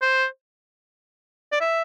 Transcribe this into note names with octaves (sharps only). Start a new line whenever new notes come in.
C5
D5
E5